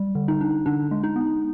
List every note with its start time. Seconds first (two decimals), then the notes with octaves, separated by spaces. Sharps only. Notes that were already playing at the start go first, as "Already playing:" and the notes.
Already playing: G3
0.15 D3
0.28 D#4
0.41 D4
0.66 D3 D4
0.91 G#3
1.04 D#4
1.16 B3